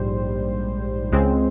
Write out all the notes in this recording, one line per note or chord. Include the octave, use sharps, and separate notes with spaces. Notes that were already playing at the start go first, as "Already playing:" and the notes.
Already playing: A#1 G#2 G3 C5
C#2 C#3 G#3 C4